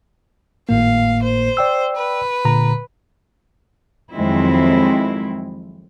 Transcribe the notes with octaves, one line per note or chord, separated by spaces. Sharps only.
G#1 A2 A#3 F5
C5
D5 G5 E6
B4
A#2 D3 A#5
F2 D#3 F#3 G#3 C4 E4